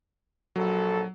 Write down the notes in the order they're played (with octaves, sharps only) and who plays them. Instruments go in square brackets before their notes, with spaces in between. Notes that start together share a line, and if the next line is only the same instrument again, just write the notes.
[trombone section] A#1 A4 [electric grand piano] F#3